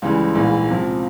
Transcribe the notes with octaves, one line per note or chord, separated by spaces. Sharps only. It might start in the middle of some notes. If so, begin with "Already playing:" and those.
C#2 C#3 E3 G3
A#1 G#2 E3 A#3
C#2 C3 F3